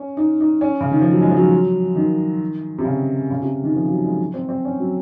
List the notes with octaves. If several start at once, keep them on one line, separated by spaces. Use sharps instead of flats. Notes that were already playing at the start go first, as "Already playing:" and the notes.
Already playing: C#4
D#4
D#4
C#4
C#3
D#3
F3
F#3
G#3
F3
F#3
D#3
C3
C#3
C#3
C3
D#3
F3
F#3
G#3
C4
C4
C#4
F#3